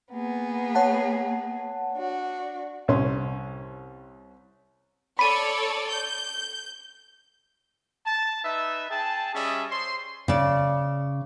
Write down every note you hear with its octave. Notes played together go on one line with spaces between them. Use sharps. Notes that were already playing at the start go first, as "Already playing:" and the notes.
A#3 B3 G#4
C#5 F#5 A5
D4 F#4
C2 C#4 C6
A4 C#5 D5 B5 D#7
G6
A5
D#4 B4 E5
G#4 G5 A5
G3 C#4 G#4 D#5 E5
C5 C#5 C6
C#3 D5